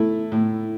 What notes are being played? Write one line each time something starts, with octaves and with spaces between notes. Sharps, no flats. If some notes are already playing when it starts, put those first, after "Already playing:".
Already playing: A2 A3 E4
A2